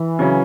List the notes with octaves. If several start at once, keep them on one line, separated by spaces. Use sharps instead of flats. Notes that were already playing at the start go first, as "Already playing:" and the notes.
Already playing: E3
C#3 F#3 C#4